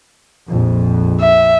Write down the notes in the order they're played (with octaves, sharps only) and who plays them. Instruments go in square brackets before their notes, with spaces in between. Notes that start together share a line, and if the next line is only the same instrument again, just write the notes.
[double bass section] A#1 F2
[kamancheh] E5